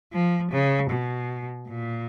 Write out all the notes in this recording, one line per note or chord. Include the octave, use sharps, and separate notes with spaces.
F3
C#3
B2
A#2